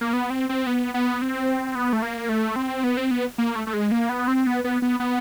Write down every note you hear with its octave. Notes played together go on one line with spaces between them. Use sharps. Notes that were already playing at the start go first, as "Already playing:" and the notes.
A#3
B3
C4
C4
B3
B3
C4
B3
A3
A#3
A3
C4
B3
C4
B3
A#3
A3
A3
G#3
A#3
B3
C4
B3
B3
B3
B3